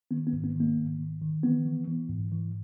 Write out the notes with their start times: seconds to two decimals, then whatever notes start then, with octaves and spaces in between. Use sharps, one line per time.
0.11 D#3 B3
0.27 B3
0.33 G#2
0.44 B3
0.55 D#3
0.60 A#3
0.77 G#2
0.99 D#3
1.22 D#3
1.43 E3 B3
1.65 E3
1.88 E3
2.09 G#2
2.32 E3